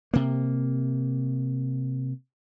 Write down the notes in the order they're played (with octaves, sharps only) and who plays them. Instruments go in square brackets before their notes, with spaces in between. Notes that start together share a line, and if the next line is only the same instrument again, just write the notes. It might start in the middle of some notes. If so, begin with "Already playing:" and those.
[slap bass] C3 A#3